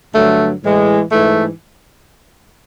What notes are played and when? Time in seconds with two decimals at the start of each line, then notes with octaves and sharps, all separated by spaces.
0.14 G2 D3 F#3 A3
0.63 A2 E3 G#3
1.10 G#2 E3 A3